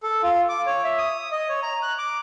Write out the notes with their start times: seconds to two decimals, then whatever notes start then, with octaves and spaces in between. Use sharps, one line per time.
0.03 A4
0.23 F4
0.49 D6
0.66 C#5
0.84 E5
0.98 D#6
1.32 D#5
1.49 C#5
1.63 A#5
1.83 F#6
1.98 D6